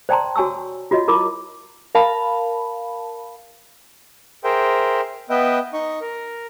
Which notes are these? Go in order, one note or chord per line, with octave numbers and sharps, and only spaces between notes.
C5 D5 G5 A5 A#5 C6
F#4 C#5 G#5 A5 C#6 E6
F4 F#4 C#5 D#5
E4 F4 A#4 B5 C6 D6
A#4 F5 A5 B5
G#4 A#4 C5 E5 G5
B3 B4 D#5 E5 G5
D#4 D#5 C#6
A#4